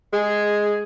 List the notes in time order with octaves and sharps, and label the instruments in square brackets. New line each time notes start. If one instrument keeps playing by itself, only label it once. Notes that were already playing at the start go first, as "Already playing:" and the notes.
[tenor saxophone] G#3 [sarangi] G#4